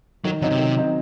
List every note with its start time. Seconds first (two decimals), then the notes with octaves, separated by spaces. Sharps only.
0.25 D#3 F#3
0.42 D3 F#3 C4 D#4
0.51 C3
0.59 D#3
0.76 F#3 C4 D#4